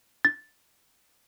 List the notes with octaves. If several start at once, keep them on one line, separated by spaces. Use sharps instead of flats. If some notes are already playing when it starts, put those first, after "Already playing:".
A6